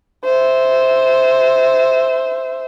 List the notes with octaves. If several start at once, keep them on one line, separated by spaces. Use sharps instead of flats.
C5 E5